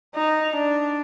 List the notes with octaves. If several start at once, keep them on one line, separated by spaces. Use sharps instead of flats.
D#4
D4